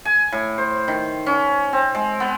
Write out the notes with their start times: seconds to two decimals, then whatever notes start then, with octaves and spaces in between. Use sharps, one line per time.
0.05 G#5
0.32 A2
0.58 C5
0.88 D#3
1.26 C#4
1.73 C4
1.95 G#3
2.20 B3